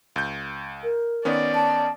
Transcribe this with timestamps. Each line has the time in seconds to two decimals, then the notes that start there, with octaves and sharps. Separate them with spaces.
0.16 C#2 G6
0.84 A#4
1.25 D#3 B3 C#4 D5
1.55 A5